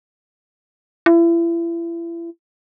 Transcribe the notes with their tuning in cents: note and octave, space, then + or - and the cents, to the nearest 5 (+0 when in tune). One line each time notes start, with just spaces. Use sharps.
E4 +35